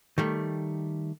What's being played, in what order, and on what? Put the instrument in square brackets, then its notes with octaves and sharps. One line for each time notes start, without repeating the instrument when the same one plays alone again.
[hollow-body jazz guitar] D#3 G3 A3